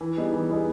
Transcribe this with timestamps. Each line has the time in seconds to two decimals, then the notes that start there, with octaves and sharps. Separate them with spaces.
0.01 E3
0.17 G3 B3 D#4 G#4
0.34 E3
0.50 G3 B3 D#4 G#4